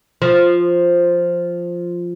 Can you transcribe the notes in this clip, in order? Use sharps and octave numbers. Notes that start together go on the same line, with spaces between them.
F3